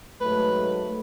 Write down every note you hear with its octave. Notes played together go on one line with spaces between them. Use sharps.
G#2 F#3 A3 B4